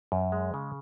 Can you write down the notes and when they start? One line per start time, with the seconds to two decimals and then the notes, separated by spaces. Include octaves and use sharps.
0.12 F#2
0.32 G#3
0.54 C#3